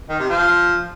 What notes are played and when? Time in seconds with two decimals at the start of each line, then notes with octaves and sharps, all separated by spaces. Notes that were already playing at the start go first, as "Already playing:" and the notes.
0.09 D#3
0.19 C3
0.30 F3